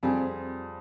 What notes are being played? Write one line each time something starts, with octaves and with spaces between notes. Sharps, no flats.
F2 G3 C4 F4 G#4